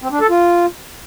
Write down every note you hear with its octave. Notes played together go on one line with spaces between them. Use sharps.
C4
D4
A4
F4